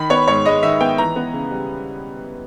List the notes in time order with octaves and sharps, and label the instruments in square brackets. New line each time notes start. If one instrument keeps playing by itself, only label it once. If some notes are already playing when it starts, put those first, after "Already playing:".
Already playing: [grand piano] D#3 B5
B3 C#5
G#2 C#5
G#3 D#5
D#3 E5
B3 G5
E3 A#5
B3
C#3
G3